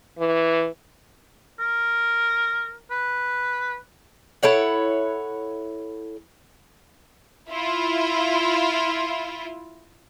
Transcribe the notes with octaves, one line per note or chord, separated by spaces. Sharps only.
E3
A#4
B4
E4 A4 C#5 F#5
E4 F4